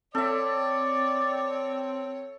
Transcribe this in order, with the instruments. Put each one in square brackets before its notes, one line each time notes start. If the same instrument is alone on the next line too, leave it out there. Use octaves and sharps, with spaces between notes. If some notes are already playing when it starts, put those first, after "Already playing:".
[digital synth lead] C4 [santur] A4 E5 [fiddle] C#5 [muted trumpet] D5